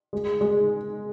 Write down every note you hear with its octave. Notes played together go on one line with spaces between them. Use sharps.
G#3
G#3